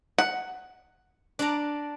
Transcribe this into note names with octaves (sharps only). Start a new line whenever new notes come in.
F#5
D4 D5 A#5